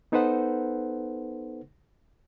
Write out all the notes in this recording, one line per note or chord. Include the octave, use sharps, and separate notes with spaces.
B3 D#4 A4 B4 C5 F#5